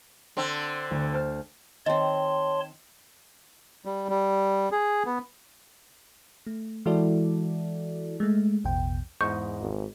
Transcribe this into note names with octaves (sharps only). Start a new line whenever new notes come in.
D3 C4
D2
C5 A5 F6
D#3 C4 C#5 D#5 A5 C6
G3
G3
G#4
B3
A3
E3 G#3 E4 F#4 A4 D5
G#3 A3
A1 E2 B2 G5
E2 G#2 D#5 C#6 G6
G#1